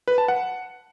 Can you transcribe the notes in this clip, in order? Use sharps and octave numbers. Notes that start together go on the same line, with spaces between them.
B4
A5
F#5